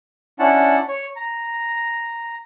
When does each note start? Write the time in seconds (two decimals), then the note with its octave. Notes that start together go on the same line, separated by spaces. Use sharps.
0.39 C#4 D4 E4 F#5 A5
0.88 C#5
1.16 A#5